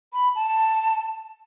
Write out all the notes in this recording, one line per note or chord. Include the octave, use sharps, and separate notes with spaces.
B5
A5